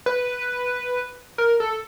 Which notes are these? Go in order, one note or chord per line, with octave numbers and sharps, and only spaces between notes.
B4
A#4
A4